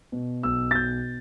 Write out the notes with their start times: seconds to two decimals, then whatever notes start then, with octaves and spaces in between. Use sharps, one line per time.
0.12 B2
0.43 B1 E6
0.71 A6
0.75 B2 G6